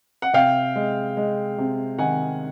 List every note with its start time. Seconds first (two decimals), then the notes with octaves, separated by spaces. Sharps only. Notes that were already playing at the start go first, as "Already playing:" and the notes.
0.22 F#5
0.33 C3 F5 G5
0.76 G#3
1.17 G#3
1.58 C3
1.98 D#3 F#5 G#5